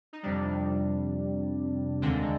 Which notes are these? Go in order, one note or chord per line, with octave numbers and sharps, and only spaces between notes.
D#4
F2 C3 G3 D4
D#2 D3 G#3 C4